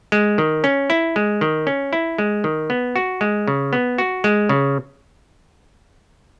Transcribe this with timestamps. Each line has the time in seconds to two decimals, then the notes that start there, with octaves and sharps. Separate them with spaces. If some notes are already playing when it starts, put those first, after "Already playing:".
0.12 G#3
0.38 D#3
0.64 C#4
0.90 E4
1.16 G#3
1.41 D#3
1.67 C#4
1.93 E4
2.18 G#3
2.44 D#3
2.70 B3
2.96 F#4
3.21 G#3
3.48 C#3
3.73 B3
3.98 F#4
4.24 G#3
4.49 C#3